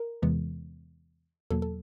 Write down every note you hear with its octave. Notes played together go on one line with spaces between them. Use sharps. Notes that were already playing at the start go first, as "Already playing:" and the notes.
Already playing: A#4
E2 C3 E3 G#3 B3
E2 B2 F#3 A#3 A4
A4